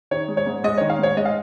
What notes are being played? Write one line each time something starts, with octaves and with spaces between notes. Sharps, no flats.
D#3 C#5
G#3
C#5
G#2
G#3 D#5
D#3 C#5
F5
G#2 C#5
G#3 D#5
F5